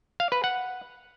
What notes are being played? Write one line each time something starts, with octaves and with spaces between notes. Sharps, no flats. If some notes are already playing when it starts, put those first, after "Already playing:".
F5
B4
F#5